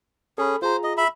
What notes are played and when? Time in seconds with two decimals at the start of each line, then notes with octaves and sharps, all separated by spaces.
0.38 C#4 G#4 A4 B5
0.62 F4 G#4 C5 A#5
0.83 D#5
0.97 E5 B5